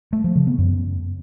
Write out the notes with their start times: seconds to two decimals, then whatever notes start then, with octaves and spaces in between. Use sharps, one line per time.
0.13 A3
0.24 F3
0.36 C#3
0.47 B3
0.58 F#2